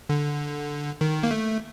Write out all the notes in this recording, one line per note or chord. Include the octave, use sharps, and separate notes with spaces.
D3
D#3
A#3
A3